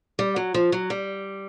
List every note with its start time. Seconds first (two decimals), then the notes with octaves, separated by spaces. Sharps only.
0.19 G3
0.36 F#3
0.54 F3
0.72 F#3
0.90 G3